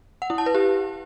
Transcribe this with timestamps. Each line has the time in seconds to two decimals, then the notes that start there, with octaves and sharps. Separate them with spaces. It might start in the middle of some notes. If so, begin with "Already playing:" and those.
0.22 F#5
0.30 E4
0.38 A5
0.46 B4
0.55 G4